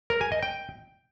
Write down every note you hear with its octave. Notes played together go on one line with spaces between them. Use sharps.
A#4
G#5
D#5
G5